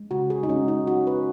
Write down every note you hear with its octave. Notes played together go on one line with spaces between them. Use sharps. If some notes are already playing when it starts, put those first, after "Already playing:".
Already playing: G#3
C#3 F#4
G#4
D#4
G#3 C#4
D#4
G#3 F#4
B4